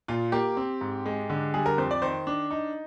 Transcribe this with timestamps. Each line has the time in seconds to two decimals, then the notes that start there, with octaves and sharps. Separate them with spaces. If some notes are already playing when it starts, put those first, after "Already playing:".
0.08 A#2 F4
0.32 A#3 G4
0.57 C4
0.81 G#2
1.06 G#3
1.30 D3
1.54 G3 G#4
1.66 A#4
1.78 F2 C5
1.91 D5
2.02 D#3 C5
2.27 D4
2.51 D#4